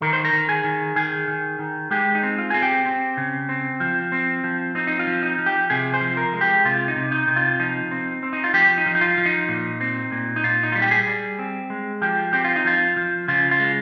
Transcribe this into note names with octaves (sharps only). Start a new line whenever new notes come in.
D#3 A#4
C5
A#4
D#3
G#4
D#3
D#3 G#4
D#3
D#3
G#3 G4
D#4
C4
F4
C4 G#4
G4
C4
C#3
C4
F3
C4
F3
C4 D#4
D#4
F4
F3
D#4
F3
G4
C3 G#4
C5
F3
A#4
G#3
G4
C3 F4
D#4
C3
D#4
C3
F4
F3 D#4
C4
C4
D#4
F4
F3 G4
D#4
F3
D#4
F4
F3
D#4
A#2
C4
A#2
D#4
A#2 F4
D#4
G3 F4
G4
G#4
G3
C4
G#3
F3 G4
C4 G4
F4
D#4
F3 F4
F3
C#3 F4
F4
G#3